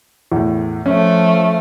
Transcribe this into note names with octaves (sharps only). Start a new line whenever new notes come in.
E2 A2
F3 A3 C#4